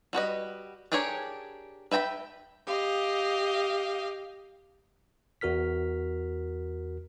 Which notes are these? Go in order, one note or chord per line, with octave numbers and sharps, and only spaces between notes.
G3 F#4 B4 D#5
D4 G4 G#4 A#4 C#5
B4 E5 G5 A#5 B5
G4 D#5 F5
E2 F#4 A#4 F6 B6